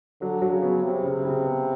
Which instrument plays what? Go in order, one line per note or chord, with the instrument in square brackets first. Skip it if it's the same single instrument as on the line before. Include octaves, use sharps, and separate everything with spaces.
[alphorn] D3 [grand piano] F#3
[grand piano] F#3
[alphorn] C#3
[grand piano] B3
[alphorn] C3 [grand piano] F#3
[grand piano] C#3
C#3
B3